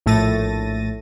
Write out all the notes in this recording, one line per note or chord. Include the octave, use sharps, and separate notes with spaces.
A#1 A2 A3 A6 A#6 D#7